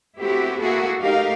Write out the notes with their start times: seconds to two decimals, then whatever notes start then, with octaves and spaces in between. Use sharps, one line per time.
0.18 A3 B3 C4 E4 F#4 G4
0.60 A#3 E4 F#4 G#4 A4
1.00 A3 D#4 G4 A#4 F5